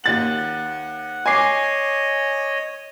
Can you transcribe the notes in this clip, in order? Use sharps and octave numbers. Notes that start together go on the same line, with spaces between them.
D#2 F#5 A6 F#7
C#5 D#5 G#5 D6 C7